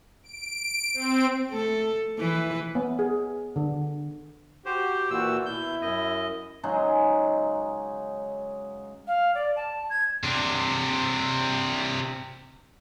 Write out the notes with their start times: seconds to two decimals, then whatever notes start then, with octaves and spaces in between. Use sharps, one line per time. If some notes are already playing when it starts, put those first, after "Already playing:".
0.23 D7
0.94 C4
1.50 A3 A4
2.18 E3 B4
2.75 B3
2.99 G#4
3.56 D3
4.66 F#4 G4 C5
5.10 A#2 E3 F#4 E6
5.46 B2 E4 G6
5.82 F#2 D#5
6.63 C#3 F#3 G#3 D#4
9.08 F5
9.35 D5
9.56 A5
9.90 G#6
10.23 C3 D4